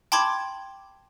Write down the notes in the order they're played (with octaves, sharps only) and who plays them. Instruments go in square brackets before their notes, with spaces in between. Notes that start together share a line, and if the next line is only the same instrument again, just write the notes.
[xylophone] G5 A5 B5 C6 D6 G#6